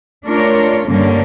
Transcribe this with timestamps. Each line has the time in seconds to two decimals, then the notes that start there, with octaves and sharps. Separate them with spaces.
0.25 A3 D4 F4 A#4 C#5
0.86 G2 D3 G3 A#3 C#4